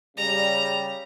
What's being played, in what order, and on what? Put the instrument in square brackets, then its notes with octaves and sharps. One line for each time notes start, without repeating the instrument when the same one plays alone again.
[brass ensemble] C#3 G3 [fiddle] A#5